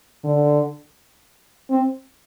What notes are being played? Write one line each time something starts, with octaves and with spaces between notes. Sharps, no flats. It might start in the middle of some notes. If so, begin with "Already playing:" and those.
D3
C4